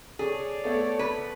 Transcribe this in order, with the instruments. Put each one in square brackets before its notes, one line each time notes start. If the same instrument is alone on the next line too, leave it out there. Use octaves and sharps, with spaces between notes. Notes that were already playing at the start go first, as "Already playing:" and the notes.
[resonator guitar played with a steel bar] G#4 [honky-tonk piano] A4 [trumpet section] C#5 D5
[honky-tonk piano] A3 B3 A4
[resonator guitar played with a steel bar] B4